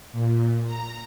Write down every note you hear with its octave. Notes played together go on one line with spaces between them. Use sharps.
A#2
A#5